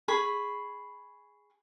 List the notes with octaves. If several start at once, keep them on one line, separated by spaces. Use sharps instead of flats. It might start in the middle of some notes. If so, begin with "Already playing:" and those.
G#4 B5 C#6